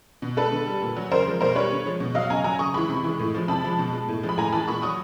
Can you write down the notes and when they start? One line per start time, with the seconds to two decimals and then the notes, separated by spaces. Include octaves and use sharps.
0.22 B2
0.37 G#3 A4 B4
0.51 D3
0.66 G3
0.82 A#2
0.97 F#3
1.11 C#3 A#4 C5
1.27 F3 G#3
1.41 B2 A#4 C5
1.55 G3 B4 C#5
1.71 D3
1.86 F3 G#3
2.00 B2
2.15 F#3 D#5 F5
2.30 C#3 G#5 A#5
2.44 F#3 G#5 A#5
2.59 C#3 C#6 D#6
2.74 E3 G#3 B5 C#6
2.89 C3
3.04 E3 G#3
3.19 A2
3.34 F3 G#3
3.48 C3 A5 B5
3.64 F3 G#3
3.79 B2
3.93 G#3
4.08 A2
4.23 F3 G#3
4.29 B5
4.38 A2 G#5 A#5
4.52 E3 G#3 A5 B5
4.67 A#2 B5 C#6
4.82 F#3 C#6 D#6